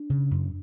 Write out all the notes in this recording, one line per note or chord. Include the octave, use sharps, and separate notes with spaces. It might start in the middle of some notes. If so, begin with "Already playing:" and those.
Already playing: D4
C#3
F#2